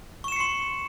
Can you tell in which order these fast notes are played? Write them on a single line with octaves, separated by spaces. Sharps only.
C#6 E7 C#7 C7 C6